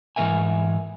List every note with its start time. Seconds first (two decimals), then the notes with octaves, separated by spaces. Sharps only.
0.16 G#2 E3 G#3 A#4 E5 G#5